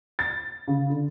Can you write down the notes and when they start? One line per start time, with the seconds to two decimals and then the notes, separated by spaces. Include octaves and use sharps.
0.19 A6
0.68 C#3
0.90 D3